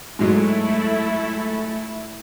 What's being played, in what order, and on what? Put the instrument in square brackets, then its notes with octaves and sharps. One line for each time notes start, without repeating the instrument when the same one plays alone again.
[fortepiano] G#2 F#3 G#3 [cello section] A3 [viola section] E4